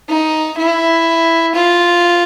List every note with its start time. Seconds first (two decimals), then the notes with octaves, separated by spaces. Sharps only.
0.09 D#4
0.58 E4
1.55 F4